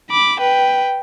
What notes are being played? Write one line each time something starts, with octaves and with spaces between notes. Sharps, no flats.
B5 D6
B4 G5